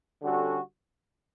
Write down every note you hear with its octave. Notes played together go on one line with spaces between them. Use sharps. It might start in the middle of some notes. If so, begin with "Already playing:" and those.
D3 G3 C#4 F#4 A4